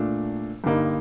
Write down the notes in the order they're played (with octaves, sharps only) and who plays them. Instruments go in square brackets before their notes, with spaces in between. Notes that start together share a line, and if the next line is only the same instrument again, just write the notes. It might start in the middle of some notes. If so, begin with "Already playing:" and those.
Already playing: [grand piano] A#2 A3 D4
G2 D3 G3 A#3 D#4